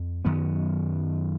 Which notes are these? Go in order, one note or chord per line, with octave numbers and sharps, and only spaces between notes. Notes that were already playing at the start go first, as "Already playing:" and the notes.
Already playing: F2
F#2 D#3 F#3 B3